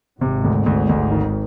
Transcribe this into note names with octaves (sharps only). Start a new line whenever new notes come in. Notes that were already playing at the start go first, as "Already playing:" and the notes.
G#1 G#2 C3
D2
D2
D2
D#3